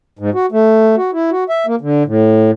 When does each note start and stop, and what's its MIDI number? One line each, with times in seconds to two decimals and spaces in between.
0.19 0.30 44
0.34 0.46 66
0.52 0.96 57
0.97 1.11 66
1.13 1.30 64
1.31 1.44 66
1.49 1.66 76
1.66 1.75 58
1.81 2.03 50
2.05 2.51 45